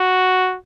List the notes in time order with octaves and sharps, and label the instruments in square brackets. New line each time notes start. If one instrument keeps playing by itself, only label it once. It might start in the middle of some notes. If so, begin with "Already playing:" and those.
Already playing: [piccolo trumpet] F#4